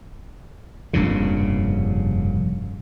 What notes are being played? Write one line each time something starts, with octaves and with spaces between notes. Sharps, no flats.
F1 G2 A#2 C#3